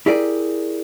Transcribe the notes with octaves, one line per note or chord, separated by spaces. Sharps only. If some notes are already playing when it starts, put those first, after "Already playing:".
E4 G4 G#4 A#4 D5